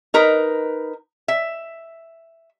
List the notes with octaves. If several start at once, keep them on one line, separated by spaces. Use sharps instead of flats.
D#4 A#4 B4
E5